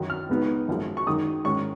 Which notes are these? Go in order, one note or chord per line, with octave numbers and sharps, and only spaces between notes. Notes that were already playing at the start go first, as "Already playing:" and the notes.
Already playing: F#2 D#3 F#3
F6
C#2 B2 G#3 B3 D#4
G#1 F#2 F3 G#3
C#6
F#2 D#3 G#3 D#4 D#6
G#2 D#3 G#3 C#4 C#6